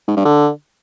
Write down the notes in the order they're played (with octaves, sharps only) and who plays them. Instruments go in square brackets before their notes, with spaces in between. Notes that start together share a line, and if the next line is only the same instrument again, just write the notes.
[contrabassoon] G#2
G2
D3